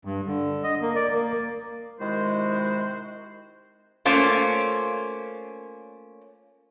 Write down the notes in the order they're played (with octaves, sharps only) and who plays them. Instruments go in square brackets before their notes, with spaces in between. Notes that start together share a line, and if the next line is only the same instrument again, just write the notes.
[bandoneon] G2
D3
D#5
A#3
D5
A#3
[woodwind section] C3 D#3 G#3 E4 F#4 C5
[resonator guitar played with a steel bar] A3 A#3 C#4 F4 C5